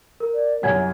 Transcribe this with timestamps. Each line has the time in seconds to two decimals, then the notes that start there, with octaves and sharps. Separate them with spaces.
0.20 A#4
0.35 D5
0.63 C2 F#2 F#5 G#5 G#6